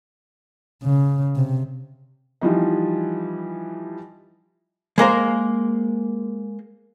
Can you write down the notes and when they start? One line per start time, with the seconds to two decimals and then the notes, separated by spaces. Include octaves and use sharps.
0.83 C#3
1.36 C3
2.41 E3 F3 G3 D#4
4.98 G#3 A#3 A#4 C5